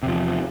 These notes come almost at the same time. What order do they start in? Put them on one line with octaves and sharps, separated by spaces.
C3 E2 F3